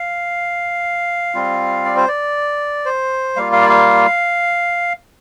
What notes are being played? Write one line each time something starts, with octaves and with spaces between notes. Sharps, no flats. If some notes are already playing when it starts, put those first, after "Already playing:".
Already playing: F5
G3 C4 F4
D5
C5
D5
C5
G3 A#3 F4 F5
F5
D5
F5